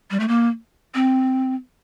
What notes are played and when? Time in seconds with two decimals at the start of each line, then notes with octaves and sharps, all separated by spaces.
0.11 G3
0.20 A3
0.28 A#3
0.95 C4